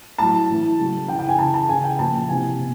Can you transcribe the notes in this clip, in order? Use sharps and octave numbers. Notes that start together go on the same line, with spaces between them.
A2 F#3 A5
A2 E3
C#3 F#3
C#3 E3 G5
G5
G#5
C#3 E3 A5
A5
C#3 E3 G#5
G5
A#2 F3 A5
C3 E3 G#5
B2